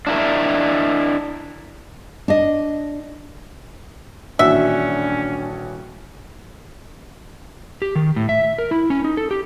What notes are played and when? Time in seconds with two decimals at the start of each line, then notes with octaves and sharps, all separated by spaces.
0.07 D4 E4 A#4
2.28 D4 D#5
4.39 D#1 A1 C#4 D4 F#4 E5
7.82 G4
7.96 D#3
8.16 A2
8.29 E5
8.58 A#4
8.71 E4
8.90 C#4
9.05 D#4
9.17 A4
9.31 G4